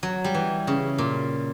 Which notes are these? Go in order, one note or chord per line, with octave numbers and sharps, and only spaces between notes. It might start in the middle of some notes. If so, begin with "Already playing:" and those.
F#3
G3
E3
C#3
A#2